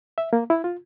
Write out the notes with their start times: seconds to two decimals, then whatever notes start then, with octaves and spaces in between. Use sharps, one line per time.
0.18 E5
0.33 A#3
0.50 E4
0.64 F4